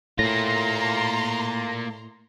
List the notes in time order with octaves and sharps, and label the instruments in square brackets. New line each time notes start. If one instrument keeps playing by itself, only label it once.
[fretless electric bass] A2 [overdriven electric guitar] A#3 F4 [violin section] A#5 C6 [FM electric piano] A#6